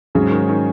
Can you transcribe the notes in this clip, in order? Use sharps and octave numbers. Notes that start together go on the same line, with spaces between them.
G#2 C#3 F#3 C#4 G#4
D#3
D#3